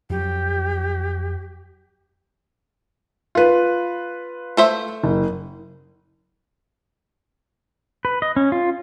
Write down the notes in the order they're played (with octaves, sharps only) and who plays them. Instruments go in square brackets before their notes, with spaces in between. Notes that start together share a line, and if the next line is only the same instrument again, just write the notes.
[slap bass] F2 F#3 [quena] G4
[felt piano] F4 B4
[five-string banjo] A3 C5 E5
[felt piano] F#1
[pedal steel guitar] B4
D#5
C#4
F4